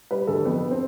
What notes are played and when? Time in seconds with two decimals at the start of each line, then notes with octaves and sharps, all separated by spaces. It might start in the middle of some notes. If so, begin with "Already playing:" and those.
0.11 G3 B4
0.27 D2 A4
0.45 F2 B3
0.71 C4